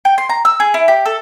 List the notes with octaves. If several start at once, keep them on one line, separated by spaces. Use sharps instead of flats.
G5
C6
A#5
E6
G#4
E4
G4
A4